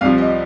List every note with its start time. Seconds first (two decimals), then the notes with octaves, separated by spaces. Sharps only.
0.01 C2 C3 F3 F5
0.18 D#5